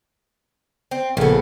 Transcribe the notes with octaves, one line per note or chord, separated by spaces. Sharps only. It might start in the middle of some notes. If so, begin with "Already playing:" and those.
C4
A#1 C#3 B3 A4